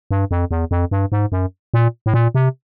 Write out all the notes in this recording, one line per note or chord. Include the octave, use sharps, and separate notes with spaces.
G2
F2
E2
F2
G2
G#2
F#2
A#2
A2
A#2
C3